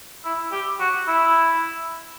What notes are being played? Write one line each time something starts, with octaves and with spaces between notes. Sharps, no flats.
E4
G4
F#4
E4